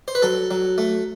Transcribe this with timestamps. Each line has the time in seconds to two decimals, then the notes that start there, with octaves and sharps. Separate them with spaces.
0.08 C5
0.15 B4
0.22 F#3 A4
0.51 F#3
0.78 A3